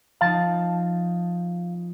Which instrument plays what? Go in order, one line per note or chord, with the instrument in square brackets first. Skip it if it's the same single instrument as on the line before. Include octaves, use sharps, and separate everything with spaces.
[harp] F3 C4 D#4 [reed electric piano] F5 [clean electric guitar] A5